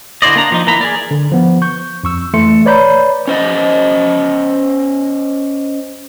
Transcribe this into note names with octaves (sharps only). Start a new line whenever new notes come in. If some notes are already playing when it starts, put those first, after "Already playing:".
D3 E4 C5 D5 D#5
A#3 D4 A#5
F3 D#4
E3 A#3 A#5 B5
G#4 A#4 D5
D3
F3 B3
C#6 G6
F2 C#6 E6
E3 A3 C6 C#7
B4 C#5 D5 A#5 B5 G6
C#4 C5 D#5